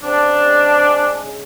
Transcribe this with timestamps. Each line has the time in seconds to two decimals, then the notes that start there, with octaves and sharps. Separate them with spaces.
0.03 C#3 C4 D4
0.43 G#3
0.83 G#3
1.23 C#3